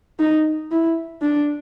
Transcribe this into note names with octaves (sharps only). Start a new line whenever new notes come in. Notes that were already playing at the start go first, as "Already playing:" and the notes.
D#4
E4
D4